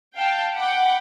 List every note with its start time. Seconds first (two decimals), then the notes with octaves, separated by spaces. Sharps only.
0.17 F5 G5 A5
0.56 F#5 G5 B5 D6